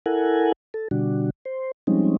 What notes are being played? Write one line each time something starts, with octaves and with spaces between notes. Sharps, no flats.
E4 A4 A#4 F#5 G#5
A4
B2 D3 G3 D4 F#4
C5
F3 G3 G#3 C4 C#4 D#4